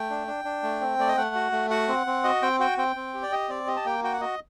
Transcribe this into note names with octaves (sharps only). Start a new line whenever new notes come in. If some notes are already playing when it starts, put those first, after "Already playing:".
Already playing: A3 G5
D4
D4
D4
A3
C4
A3 D5
D#5
A3 F#5
F#4
A3
F#4 F#5
C4
C4
F#4 D#5
C4 G5
F#4 G5
C4 G5
C4
G4
D5
G4 D#5
C4 D5
G4 D#5
A5
A#3 G5
F#4 G5
F#5
F#4 D#5